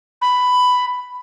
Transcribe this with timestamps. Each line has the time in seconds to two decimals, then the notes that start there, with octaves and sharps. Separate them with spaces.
0.22 B5